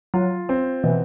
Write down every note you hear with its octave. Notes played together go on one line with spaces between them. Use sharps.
F#3 F4
C4
B2 E3